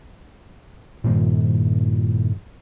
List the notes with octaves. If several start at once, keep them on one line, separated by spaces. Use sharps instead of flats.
G2 A#2 D#3 F3